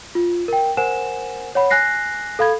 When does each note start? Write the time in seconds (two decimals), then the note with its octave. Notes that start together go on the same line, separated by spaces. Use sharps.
0.15 F4
0.48 A#4 G5
0.77 A#4 C5 F#5 G#5 E7
1.55 C#5 F#5 B5
1.70 G#5 F#6 A#6 C7
2.39 A4 F5 B5 G#6